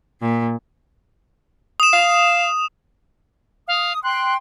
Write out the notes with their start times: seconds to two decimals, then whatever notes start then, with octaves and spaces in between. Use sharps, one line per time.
0.21 A#2
1.80 D#6 E7
1.94 F5
3.68 F5 D#6
4.03 G5 C6 F#6